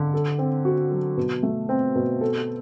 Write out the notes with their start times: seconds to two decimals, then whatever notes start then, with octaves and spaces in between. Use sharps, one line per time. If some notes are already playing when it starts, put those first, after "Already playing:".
Already playing: D3
0.14 A4
0.38 C4
0.65 F#4
0.91 F#3
1.17 B2
1.43 A3
1.69 C4
1.95 B2
2.21 A4